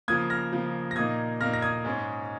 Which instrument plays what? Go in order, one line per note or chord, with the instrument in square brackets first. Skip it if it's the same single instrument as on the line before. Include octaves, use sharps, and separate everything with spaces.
[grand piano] C#3 F3 A#3 D#6 G#6
F6 A#6
C#3 F3 A#3
A#6
A#2 A#3 D#4 D#6 G#6
A#2 A#3 D#4 F6 A#6
A#6
D#6 G#6
G#2 G#3 C#4